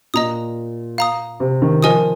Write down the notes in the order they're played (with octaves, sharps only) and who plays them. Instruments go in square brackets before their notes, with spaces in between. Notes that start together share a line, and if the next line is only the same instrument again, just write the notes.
[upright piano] A#2 [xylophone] D#5 A#5 D#6
[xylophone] F5 A#5 D#6
[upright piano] C3
D#3
[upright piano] F3 [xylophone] A#4 D#5 G#5 D#6